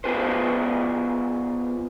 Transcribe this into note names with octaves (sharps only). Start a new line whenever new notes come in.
B3 F4 G#4 B4 C5